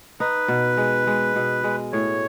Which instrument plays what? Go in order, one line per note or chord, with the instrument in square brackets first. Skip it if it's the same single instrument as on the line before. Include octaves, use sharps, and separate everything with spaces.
[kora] D#4 [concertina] B4
[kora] B2
G#3
G#3
B2
G#3
[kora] A2 [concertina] C#5